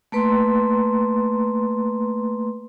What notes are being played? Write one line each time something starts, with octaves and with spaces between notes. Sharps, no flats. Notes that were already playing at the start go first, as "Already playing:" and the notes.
A3 A#3 B4 A#5 C6